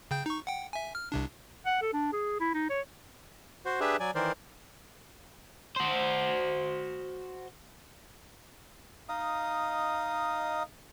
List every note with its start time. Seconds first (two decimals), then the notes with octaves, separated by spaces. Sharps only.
0.11 C#3 G5 G6
0.26 D#4 C#6
0.47 F#5 G5
0.73 E5 G#5
0.95 F6
1.12 C2 C3 D4
1.66 F#5
1.82 A4
1.93 D4
2.13 G#4
2.40 E4
2.54 D#4
2.69 C#5
3.65 F#4 C5
3.80 D4 G4 G#4 B4 E5
4.00 F#3 D5 G#5
4.15 D#3 E3 A#4 C5 D5
5.76 F#4 C5
9.09 D#4 D#5 F5 D#6